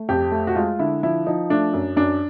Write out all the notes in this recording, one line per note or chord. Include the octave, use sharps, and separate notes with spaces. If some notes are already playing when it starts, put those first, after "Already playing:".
Already playing: A3
F2 G4
A3
F#4
G#3 F4
D3 E4
F3 E4
F3 D#4
A3 D4
F#2
F#2 D4